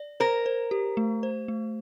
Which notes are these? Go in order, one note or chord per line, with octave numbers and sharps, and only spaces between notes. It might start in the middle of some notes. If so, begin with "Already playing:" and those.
Already playing: D5
A#4 C5
C5
G4
A3
C5
A3